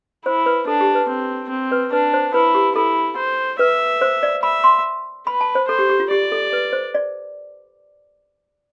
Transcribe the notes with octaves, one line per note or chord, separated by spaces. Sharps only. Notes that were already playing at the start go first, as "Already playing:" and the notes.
E4 C5
B4
D4 A4
G4
B4
C4
C4
B4
D4 B4
C5
E4 B4
G4
E4 A4
C5
B4 E5
C5
D5
E5 B5
C6
B4 B5
A5
C5
A4 C5
G4
G4
F4
G4 D5
A4
B4
C5
D5